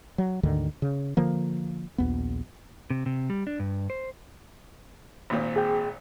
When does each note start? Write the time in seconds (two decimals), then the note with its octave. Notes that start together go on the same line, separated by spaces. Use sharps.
0.18 F#3
0.43 D2 G#2 D3 D#3
0.82 C#3
1.17 D3 F3 A#3
1.98 A#1 D#2 B3
2.90 C3
3.06 C3
3.30 G3
3.47 D4
3.59 G2
3.90 C5
5.30 G#1 A#2 C4
5.56 G#4 G5